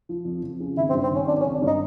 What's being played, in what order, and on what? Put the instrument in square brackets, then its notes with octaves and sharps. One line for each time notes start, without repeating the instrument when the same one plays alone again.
[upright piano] F3
F2
F2
C#3
[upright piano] G#1 [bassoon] E4
[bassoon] C4
[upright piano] G2
[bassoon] C4
[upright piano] D#3 [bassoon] C#4
[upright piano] G#1 [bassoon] D4
[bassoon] C#4
[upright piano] G#1
[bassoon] D4
[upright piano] G2
[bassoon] D#4